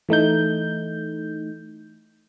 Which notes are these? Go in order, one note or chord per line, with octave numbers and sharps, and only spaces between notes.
E3 A3 D#4 G6